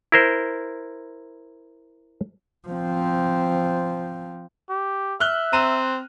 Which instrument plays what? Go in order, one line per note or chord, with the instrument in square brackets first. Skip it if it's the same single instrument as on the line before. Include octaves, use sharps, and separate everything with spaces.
[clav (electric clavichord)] E4 A#4 C5
[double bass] F3 C4
[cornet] G4
[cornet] E5 [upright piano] F6 F#6 G7
[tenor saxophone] C4 [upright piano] A#5 D#7 E7